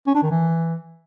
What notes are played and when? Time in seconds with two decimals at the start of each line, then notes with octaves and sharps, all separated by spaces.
0.07 C#4
0.15 D4
0.23 D#3
0.31 E3